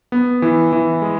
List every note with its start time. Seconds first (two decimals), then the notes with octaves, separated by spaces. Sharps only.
0.12 B3
0.42 E3
0.73 E3
1.02 G#3